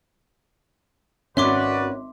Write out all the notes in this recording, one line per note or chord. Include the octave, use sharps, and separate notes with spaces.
G#1 C#4 F#4 B4 D5 E5 C6 D6